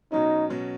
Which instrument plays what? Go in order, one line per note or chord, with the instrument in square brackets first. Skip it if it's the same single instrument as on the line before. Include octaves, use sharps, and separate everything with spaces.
[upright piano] B2 F#3 C#4 [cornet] D#4
[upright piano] B2 F#3 C#4